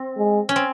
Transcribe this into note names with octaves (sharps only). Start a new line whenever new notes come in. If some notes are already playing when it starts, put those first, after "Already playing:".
Already playing: C4
G#3
C#4
C4